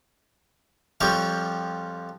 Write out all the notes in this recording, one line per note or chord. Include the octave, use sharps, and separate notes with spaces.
F2 F3 G3 G4 C#5 G5